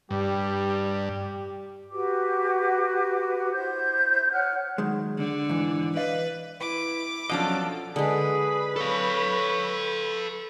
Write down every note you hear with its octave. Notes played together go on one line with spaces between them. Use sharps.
G2 G3 G4
F#4 G4 B4 D6
E4 C5 G6
C#5 F#5 F6 F#6
D#3 F#3 G#3
D3
G#2 E3
B4 D5 D#5 F5
E4 B4 D6
B2 F3 F#3 C#4 D4 F4 A4 D#5
D3 G#3 G#4 B4 B5
A4 C#5 F5